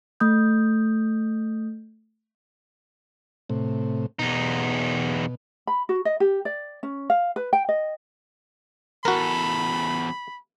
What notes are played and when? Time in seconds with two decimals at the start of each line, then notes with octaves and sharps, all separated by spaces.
0.20 A3 D#6 G6
3.50 A2 C3
4.19 E2 B2 D#4
5.67 B5
5.89 F#4
6.05 D#5
6.20 G4
6.45 D5
6.83 C#4
7.10 F5
7.36 B4
7.53 G5
7.69 D#5
9.05 E2 F#4 A4 A#4 B5